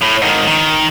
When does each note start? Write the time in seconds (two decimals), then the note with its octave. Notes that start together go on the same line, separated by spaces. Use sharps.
0.02 A2
0.22 G#2 D#3
0.48 D#3